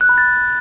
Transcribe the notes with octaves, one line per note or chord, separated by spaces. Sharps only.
F#6
B5
A6